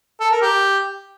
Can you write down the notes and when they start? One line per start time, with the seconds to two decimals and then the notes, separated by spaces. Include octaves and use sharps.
0.20 A4
0.31 A#4
0.42 G4